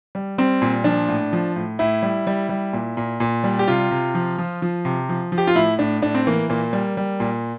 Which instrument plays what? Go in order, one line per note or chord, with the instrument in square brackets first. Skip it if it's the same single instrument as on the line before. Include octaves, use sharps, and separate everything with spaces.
[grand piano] G3
G3 C4
A#2
F3 D4
A2
F3
A2
A2 E4
G3
G3
G3
A#2
A#2
A#2
G3
G4
C3 F4
C3
F3
F3
F3
C3
F3
F3
G4
F4
A2 E4
A2 D4
A2 D4
C4
E3 A#3
A#2 A#3
G3
G3
A#2